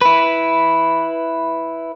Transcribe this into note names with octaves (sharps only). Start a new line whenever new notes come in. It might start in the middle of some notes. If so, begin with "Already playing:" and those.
E4 B4